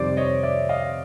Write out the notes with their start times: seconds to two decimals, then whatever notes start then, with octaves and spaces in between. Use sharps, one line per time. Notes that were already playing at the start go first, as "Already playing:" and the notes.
Already playing: F2 C3 D#3 G3 C5 D5
0.17 C#5 D#5
0.43 D5 E5
0.69 D#5 F5